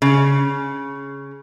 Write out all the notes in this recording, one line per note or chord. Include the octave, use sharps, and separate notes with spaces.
C#3